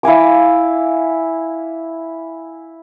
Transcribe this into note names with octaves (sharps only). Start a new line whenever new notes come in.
E4 F5 G#5 D6